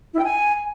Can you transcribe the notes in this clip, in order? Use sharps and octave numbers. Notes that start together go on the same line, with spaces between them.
E4
G5
G#5